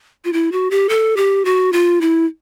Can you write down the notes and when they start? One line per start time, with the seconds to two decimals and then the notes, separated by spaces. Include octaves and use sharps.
0.25 F4
0.33 E4
0.52 F#4
0.71 G4
0.89 A4
1.17 G4
1.45 F#4
1.73 F4
2.01 E4